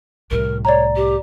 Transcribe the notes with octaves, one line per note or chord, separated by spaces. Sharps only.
C2 A2 A#4
C#5 D5 A#5
G4